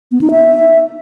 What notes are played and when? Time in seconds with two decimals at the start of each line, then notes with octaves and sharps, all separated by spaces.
0.12 B3
0.21 D#4
0.31 E5